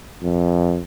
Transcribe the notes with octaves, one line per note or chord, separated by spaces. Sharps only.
F2